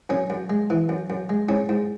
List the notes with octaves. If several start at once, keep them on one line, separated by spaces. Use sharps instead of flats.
F#2 C#4
F#2
G#3
E3
F#2
F#2
G#3
G#2 C#4
G#2